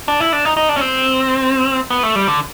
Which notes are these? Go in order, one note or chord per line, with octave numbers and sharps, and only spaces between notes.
D4
E4
D4
D#4
D#4
D4
C#4
C4
B3
A3
G3
D3